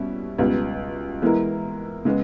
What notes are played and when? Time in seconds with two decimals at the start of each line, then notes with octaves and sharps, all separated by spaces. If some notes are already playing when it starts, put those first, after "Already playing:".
Already playing: B2 G3 C#4 E4
0.39 C#2 B2 G3 B3
1.22 E3 G#3 B3 E4 A#4
2.05 C#3 G#3 B3